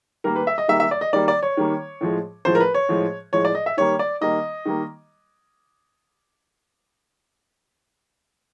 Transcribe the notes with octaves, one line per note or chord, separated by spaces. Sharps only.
D#3 G3 A#3 A#4
B4
E5
D#5
D#3 G3 A#3 E5
E5
D5
D#5
D#3 G3 A#3 D5
D5
C#5
D#3 G3 A#3
A2 F3 G#3
A2 F3 G#3 C5
A#4
B4
C#5
A2 F3 G#3
A2 F3 G#3 C#5
D5
D#5
E5
D#3 G3 A#3 C#5
D5
D#3 G3 A#3 D#5
D#3 G3 A#3